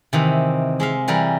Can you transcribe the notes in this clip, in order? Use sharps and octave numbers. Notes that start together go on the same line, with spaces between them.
C3 D#3 E3
G#3 E5 F5
E3 G3 A#4